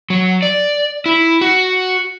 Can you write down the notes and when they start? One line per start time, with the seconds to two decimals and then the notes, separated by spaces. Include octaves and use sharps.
0.10 F#3
0.43 D5
1.06 E4
1.41 F#4